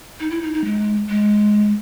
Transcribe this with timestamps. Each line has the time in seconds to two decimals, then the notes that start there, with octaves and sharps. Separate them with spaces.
0.19 D#4
0.30 E4
0.42 D#4
0.53 D#4
0.64 G#3
1.09 G#3